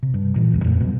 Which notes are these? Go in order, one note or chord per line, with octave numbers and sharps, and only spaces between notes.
C3
G2
A#2 E3
E1 C#2 G2
F2 A#2 A3
B2 F#3 G3